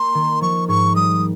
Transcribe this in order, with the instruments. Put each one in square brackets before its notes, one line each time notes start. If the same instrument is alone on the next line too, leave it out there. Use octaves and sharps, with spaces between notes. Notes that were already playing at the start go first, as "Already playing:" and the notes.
Already playing: [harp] A#3 [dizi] C6
[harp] D#3
[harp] F3 [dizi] C#6
[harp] G#2 [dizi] C#6
[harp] G3 [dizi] D#6